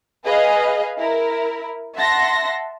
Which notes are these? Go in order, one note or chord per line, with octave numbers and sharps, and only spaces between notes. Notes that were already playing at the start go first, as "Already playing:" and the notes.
G#4 B4 D#5 F5
E4 A#4
E5 F#5 A5 C6 A#6